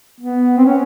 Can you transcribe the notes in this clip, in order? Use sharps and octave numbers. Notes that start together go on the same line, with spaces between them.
B3
C4
C#4